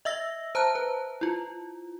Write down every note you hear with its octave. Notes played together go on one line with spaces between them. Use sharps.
D#5 E5 E6 A#6
C5 A5 A#5 F#6
B4
E4 F4